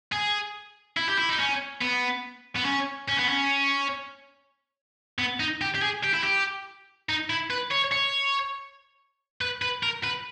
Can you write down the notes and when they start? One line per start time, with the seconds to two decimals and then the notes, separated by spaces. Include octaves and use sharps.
0.12 G#4
0.97 E4
1.08 G4
1.18 E4
1.29 D#4
1.39 C#4
1.81 B3
2.56 B3
2.65 C#4
3.08 C#4
3.18 B3
3.29 C#4
5.19 B3
5.40 D#4
5.61 G4
5.75 G4
5.82 G#4
6.04 G4
6.14 E4
6.23 G4
7.09 D#4
7.30 E4
7.50 B4
7.71 C#5
7.92 C#5
9.41 B4
9.62 B4
9.83 A#4
10.04 B4